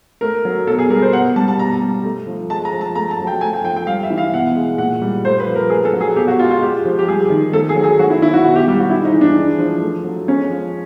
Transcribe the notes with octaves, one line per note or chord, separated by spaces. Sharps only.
A3 A#4
F#3
B2 A4
G#4
G3 A#4
C5
B2 F#5
G3 A5
A5
B2 A#5
G3
A3
F3
G#3 A5
A#5
F3
A5
A3 A#5
A5
F#3
G5
A3 G#5
G5
F3 G5
G5
G3 F5
E5
E3
F5
B2 F#5
G#3
A#2 F#5
G3
A3 C5
B4
F3
A#4
A3 G#4
A4
F#3
G#4
B2 G4
F#4
G#3 F4
F4
G#3 G4
F3
G4
G3 G#4
D#3
A3 A4
G#4
F#3
G#4
F#3 F#4
E4
D#3 E4
F#4
B2 F#4
G4
G3 G4
F#4
G#3 E4
D#4
E3
D4
G#3
F3
A3
F#3
G#3 C#4
F3